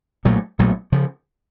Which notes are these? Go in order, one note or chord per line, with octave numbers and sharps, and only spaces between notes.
B1 A#2 F#3 A3
B1 A#2 F#3 A3
C#3 F3